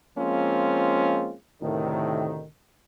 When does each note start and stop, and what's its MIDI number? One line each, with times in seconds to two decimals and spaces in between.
0.18 1.33 53
0.18 1.33 56
0.18 1.33 58
0.18 1.33 60
0.18 1.33 61
0.18 1.33 65
1.62 2.45 38
1.62 2.45 45
1.62 2.45 48
1.62 2.45 51